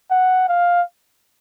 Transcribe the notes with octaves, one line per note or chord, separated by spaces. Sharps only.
F#5
F5